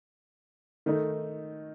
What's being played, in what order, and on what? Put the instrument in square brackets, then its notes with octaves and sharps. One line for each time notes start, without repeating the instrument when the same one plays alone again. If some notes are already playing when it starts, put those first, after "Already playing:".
[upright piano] D#3 A3 D#4